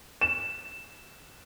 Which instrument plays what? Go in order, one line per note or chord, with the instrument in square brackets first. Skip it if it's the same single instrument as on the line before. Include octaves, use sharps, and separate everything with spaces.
[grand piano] E7